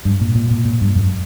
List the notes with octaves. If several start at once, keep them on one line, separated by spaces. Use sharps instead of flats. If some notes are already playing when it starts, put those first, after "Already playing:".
G2
A#2
A#2
A#2
A#2
G2
F#2